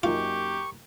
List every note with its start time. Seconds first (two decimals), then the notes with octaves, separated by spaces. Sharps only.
0.03 F#2 A#3 D#4 F4 G4 C#6